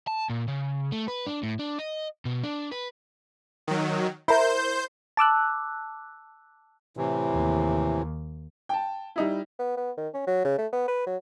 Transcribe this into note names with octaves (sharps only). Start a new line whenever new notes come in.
A5
A#2
C#3
A3
B4
D4
A2
D4
D#5
B2
D4
B4
D#3 F#3
E4 A#4 C5 G6
A5 D6 E6 F#6
A2 C3 E3
D#2
G5 A5
G3 D#4 E4
B3
B3
D#3
C#4
F#3
C#3
A3
B3
B4
F#3